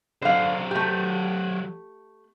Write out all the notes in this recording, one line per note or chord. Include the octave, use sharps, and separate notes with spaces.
D3 F#3 C5 F5
A3 G4